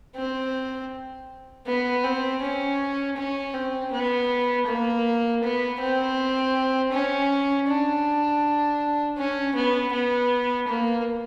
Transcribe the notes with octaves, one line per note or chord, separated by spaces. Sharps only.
C4
B3
C4
C#4
C#4
C4
B3
A#3
B3
C4
C#4
D4
C#4
B3
B3
A#3